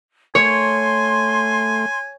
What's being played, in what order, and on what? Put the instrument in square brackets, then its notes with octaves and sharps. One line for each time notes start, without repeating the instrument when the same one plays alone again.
[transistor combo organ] A3 [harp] C#5 [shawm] G#5 [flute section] C6